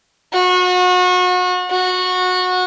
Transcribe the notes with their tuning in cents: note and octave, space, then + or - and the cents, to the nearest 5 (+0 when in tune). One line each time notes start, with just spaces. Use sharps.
F#4 -35
F#4 -20